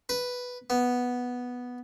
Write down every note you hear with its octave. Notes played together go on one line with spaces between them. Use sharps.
B4
B3